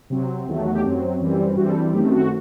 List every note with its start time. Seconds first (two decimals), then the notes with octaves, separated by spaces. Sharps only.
0.10 C3 F#3 C4
0.47 E2 D#3 F#3 A3
0.65 F#4
0.75 G4
0.84 F#2 F#3 C4
1.20 F#2 E3 G3 C4
1.56 G2 E3 G3 C4 F#4
1.69 A4
1.74 G4
1.93 F#2 D#3 A3 C4 G4
2.11 F#4